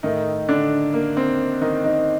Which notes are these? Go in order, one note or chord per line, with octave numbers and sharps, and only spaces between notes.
A2 D#3 A3 D#4
D3 D4
A#3
C4
D#3 D#4
D#3 D#4